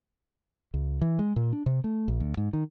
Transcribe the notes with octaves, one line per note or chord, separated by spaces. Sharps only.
C#2
E3
G#3
A#2
D4
C3
A3
A#1
D2
G#2
D#3